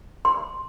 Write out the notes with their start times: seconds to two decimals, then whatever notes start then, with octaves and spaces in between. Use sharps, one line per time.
0.25 C6